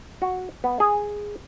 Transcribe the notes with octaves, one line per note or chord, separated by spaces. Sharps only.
F#4
B3
G#4